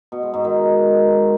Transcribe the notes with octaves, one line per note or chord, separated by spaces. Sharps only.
B2
G#3
G#2
D#3